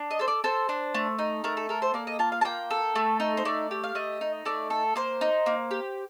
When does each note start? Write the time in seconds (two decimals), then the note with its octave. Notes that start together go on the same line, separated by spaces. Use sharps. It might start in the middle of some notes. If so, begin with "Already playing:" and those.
Already playing: D4
0.11 D#5
0.19 A4 C5
0.28 D5
0.44 A4 C5
0.69 D4
0.94 A3
1.19 D#4
1.44 A3 A#4
1.57 A4
1.69 A4 A#4
1.82 C5
1.94 A#3 D5
2.07 D#5
2.19 F4 A5
2.32 F5
2.41 A5
2.45 A#3 G5
2.70 A4
2.95 A3
3.20 D#4
3.37 C5
3.45 A3 D5
3.71 G4
3.84 F5
3.95 A3 D#5
4.21 D#4
4.45 A3 D5
4.70 A4
4.95 A#3 C5
5.21 D#4
5.46 A#3
5.71 G4